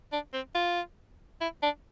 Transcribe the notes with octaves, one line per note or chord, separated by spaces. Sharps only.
D4
C4
F4
E4
D4